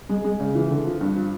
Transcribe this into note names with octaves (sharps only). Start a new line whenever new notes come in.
G#3
G#3
C#3
E3
D3
F3
G2
F3